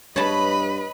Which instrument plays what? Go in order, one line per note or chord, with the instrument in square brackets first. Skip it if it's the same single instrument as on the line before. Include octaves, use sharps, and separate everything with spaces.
[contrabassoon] G2 [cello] B4 [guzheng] C#5 A5 [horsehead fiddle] D#5 B5